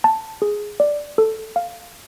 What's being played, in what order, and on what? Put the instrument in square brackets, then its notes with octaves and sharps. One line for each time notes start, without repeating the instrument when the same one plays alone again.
[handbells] A5
G#4
D5
A4
F5